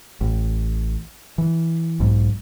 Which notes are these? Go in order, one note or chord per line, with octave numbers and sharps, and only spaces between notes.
A1
E3
B1 G#2